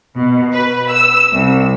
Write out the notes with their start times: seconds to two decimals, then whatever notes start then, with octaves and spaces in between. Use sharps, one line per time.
0.16 B2
0.53 B4
0.90 E6
1.33 C2